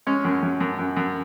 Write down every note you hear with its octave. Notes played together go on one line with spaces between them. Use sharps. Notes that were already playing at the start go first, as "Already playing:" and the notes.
G#3 C#4
F#2
F#2
F#2
F#2
F#2